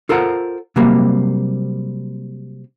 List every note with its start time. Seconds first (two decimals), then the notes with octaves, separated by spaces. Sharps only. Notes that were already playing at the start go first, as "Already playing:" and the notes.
0.09 F4 A4 A#4 C5 F#5
0.76 C3 F#3 G3 A#3 C4